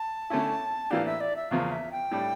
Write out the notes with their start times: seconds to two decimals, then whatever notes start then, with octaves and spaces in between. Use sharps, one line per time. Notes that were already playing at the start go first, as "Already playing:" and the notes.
Already playing: A5
0.30 D3 A3 C#4 E4
0.90 A2 E3 A#3 D4 G4 F5
1.06 E5
1.21 D5
1.36 E5
1.51 E2 C#3 F3 A#3 F5
1.71 E5
1.92 G5
2.11 A2 G3 D4